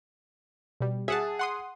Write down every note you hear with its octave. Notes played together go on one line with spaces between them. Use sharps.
B2 G3
G#4 E5 F#5 A5
F#5 C6 D#6